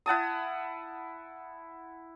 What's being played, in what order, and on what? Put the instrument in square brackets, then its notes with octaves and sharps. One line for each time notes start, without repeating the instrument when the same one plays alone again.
[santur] E4 F#5 A5 D#6